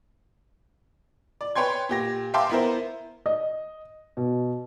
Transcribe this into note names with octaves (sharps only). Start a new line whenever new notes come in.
D5
B4 C#5 G5 C6 G#6
A#2 G4 A#6
E5 F5 G5 A5 C6 D6
B3 E4 A#4 C5
D#5
B2